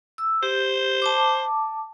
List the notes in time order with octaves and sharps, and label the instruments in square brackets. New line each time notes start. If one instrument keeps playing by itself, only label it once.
[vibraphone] E6
[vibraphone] G4 [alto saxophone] C5
[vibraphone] A5 D6